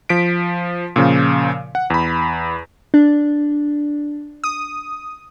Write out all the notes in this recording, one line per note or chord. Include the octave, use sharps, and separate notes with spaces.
F3 B6 D7
A#2 C#3 F3
F#5
E2 B5
D4
D#6